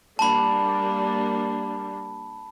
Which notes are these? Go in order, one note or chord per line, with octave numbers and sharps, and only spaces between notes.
G3 A#3 D4 A5 B5